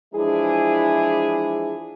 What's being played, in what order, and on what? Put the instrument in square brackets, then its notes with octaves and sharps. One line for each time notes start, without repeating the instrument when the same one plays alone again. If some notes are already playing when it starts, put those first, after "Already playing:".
[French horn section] E3 F3 G#3 D4 E4 G#4